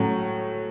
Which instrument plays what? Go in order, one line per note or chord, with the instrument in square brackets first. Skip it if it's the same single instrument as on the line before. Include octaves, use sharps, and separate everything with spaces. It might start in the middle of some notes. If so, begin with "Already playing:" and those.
Already playing: [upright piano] A2 F#3 C#4 F#4